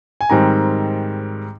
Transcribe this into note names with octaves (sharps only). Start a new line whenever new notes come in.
G#5
G#2 D#3 G3 C4 A#5